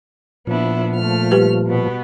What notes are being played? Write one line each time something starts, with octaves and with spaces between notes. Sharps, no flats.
A#2 F3 B3 D4 E4
A3 F6
G3 G4 B4
B2 B3